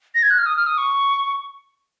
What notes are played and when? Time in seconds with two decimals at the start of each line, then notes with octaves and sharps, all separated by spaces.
0.15 A#6
0.23 G#6
0.30 F#6
0.38 F6
0.46 D#6
0.57 F6
0.67 D#6
0.78 C#6